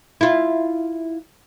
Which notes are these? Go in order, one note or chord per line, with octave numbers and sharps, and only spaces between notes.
E4 F4